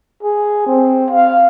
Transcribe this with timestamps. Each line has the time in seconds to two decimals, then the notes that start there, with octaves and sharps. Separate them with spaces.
0.23 G#4
0.66 C4
1.11 F5